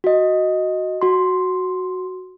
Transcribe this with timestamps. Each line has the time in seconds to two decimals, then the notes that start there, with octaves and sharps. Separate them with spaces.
0.04 F#4 D#5
1.02 F#4 C6